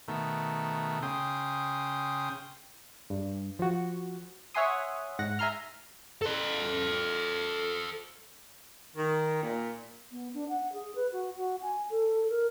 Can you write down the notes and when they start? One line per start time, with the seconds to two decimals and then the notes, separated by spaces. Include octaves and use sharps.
0.08 B2 D#3 A3
1.03 C#3 G5 C6 D#6
3.10 G2
3.59 F3 F#4
4.54 C#5 E5 F#5 G#5 C6 D#6
5.19 G#2 F#5 A#6
5.39 E5 G#5 A#5 C6 F6
6.22 A4 C5
8.97 D#3
9.42 A#2
10.12 B3
10.34 D4
10.49 F#5
10.73 G#4
10.95 B4
11.12 F#4
11.37 F#4
11.62 G#5
11.90 A4
12.29 A#4